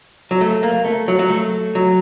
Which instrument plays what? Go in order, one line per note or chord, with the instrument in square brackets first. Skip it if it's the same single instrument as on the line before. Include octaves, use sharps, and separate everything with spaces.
[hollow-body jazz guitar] F#3
A3
A#3
A3
F#3
F#3
A3
F#3